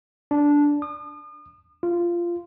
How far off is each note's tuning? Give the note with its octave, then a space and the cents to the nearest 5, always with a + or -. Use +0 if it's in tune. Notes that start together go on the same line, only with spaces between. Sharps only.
D4 -10
D#6 -40
F4 -15